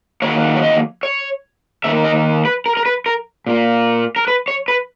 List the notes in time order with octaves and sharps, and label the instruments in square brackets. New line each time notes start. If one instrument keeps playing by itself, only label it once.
[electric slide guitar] D#3 F#3 A#3 C#5
C#5
D#5
C#5
D#3 A#3 E5
D#5
B4
A#4
A#4
B4
A#4
A#2 A#3
A#4
B4
C#5
B4